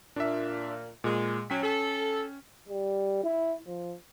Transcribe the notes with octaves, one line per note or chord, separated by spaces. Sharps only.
A#2 D4 E5
A#2 G#3
F#3 C#4 G5 B6
A4
G3
E4
F3